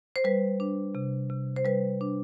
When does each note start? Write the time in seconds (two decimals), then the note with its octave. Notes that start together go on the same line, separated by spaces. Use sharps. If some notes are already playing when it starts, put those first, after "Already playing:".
0.16 C5
0.24 G3 B4
0.60 D4
0.95 C3
1.30 C3
1.56 C5
1.65 G3 B4
2.01 D4